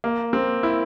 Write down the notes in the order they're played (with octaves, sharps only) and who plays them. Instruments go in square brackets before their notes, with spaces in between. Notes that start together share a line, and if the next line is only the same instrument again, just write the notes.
[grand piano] A#3
C4
E4